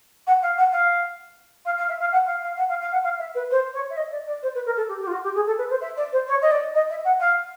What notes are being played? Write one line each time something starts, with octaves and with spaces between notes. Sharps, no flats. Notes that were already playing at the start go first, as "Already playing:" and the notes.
F#5
F5
F#5
F5
F5
F5
E5
F5
F#5
F5
F5
F#5
F5
F5
F#5
F5
E5
B4
C5
C#5
E5
D#5
D5
D5
C5
B4
A#4
A4
G4
G4
F4
F#4
G4
G#4
A4
B4
C5
E5
D5
C5
C#5
D#5
D5
D#5
E5
F#5
F5